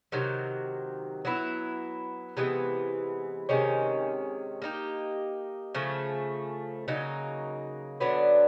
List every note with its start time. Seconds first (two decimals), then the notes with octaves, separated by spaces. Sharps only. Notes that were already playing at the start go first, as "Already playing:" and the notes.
0.12 C3 D#3 F#3
1.25 F#3 B3 E4
2.37 C3 E3 G#3 B3
3.49 C3 D#3 G#3 C#4
4.62 A#3 D#4 G4
5.74 C#3 F3 A3
6.88 C#3 F#3 A#3 D#4
8.00 D3 F#3 B3 D4